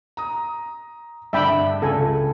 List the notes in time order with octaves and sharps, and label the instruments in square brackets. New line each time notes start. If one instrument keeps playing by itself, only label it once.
[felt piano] A#5 D#6
[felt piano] G2 D3 [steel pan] E5 G5 B5
[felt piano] C#2 C#3 [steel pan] A4 G#5